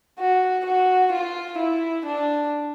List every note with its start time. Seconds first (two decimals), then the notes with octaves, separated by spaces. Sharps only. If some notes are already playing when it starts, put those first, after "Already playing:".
0.19 F#4
0.65 F#4
1.13 F4
1.59 E4
2.06 D4